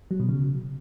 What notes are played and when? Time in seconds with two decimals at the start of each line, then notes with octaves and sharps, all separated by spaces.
0.11 F#3
0.20 B2
0.29 C#3